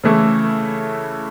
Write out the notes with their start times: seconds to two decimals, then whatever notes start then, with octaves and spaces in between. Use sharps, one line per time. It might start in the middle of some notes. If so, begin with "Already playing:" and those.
0.04 C#3 E3 A3 E4 A4